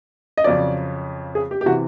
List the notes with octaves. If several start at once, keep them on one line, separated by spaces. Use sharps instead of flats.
D#5
F2 C#3 F#3 D5
G#4
G4
G4
C3 E3 F#4